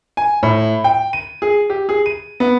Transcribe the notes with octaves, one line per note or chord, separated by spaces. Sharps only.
G#5
A2
G5
D#7
G#4
G4
G#4
D#7
B3